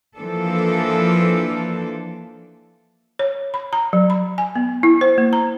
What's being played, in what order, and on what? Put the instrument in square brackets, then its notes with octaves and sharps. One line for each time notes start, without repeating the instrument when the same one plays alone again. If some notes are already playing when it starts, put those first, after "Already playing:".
[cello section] E3 F3 A#3 D4 A4
[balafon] C#5
B5
A#5
F#3
B5
G#5
B3
E4
C5
A#3
A#5